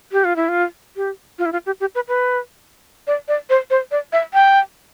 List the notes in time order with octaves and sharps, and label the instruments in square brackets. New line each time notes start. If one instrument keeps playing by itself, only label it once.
[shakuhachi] G4
F4
E4
F4
G4
F4
E4
F4
G4
G4
B4
B4
D5
D5
C5
C5
D5
E5
G5